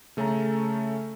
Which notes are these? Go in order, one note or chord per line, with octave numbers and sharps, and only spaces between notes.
C#3 A3 C#4 A4 A#5